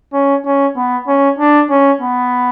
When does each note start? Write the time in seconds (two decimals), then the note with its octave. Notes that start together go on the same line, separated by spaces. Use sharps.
0.13 C#4
0.45 C#4
0.76 B3
1.08 C#4
1.39 D4
1.70 C#4
2.01 B3